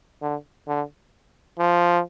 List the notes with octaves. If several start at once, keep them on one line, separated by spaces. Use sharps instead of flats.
D3
D3
F3